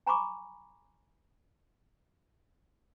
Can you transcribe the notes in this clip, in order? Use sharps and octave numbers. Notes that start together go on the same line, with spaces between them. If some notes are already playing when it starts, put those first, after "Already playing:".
G#5 A#5 B5 C#6 D6